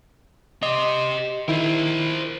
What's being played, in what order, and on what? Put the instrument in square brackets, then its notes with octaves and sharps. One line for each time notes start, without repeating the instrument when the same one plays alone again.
[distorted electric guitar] G4 C6 [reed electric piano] D#5
[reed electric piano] D#3 E4 [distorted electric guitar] A#4 C5